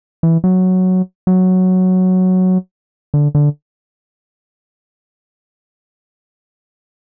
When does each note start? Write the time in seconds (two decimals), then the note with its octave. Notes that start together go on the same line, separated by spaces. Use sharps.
0.23 E3
0.44 F#3
1.27 F#3
3.14 D3
3.35 D3